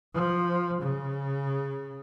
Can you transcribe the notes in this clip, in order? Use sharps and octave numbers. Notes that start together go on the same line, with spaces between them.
F3
C#3